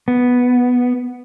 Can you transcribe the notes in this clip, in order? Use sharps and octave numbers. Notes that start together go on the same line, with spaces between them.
B3